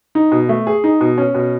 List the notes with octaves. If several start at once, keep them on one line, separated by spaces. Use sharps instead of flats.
D#4
B2
A3
G#4
D#4
B2
C#4
B2